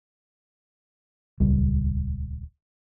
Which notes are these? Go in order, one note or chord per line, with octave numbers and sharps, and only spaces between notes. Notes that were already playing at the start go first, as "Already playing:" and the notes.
D#1 C#2 G3